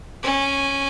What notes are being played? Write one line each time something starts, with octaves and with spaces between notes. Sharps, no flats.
C#4